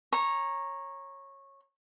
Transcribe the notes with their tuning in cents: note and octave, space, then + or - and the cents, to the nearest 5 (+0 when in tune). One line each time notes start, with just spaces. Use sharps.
C#5 -15 A#5 +0